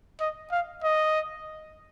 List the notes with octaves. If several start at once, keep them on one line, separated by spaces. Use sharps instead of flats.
D#5
F5
D#5